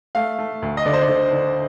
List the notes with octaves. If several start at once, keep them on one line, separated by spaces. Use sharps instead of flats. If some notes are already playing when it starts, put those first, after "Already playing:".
A3 F5
A3
D2
D#5
D3 D5
C5
D5
D3
D3